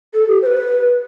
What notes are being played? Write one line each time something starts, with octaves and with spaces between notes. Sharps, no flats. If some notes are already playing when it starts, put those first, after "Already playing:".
A4
G4
C5
B4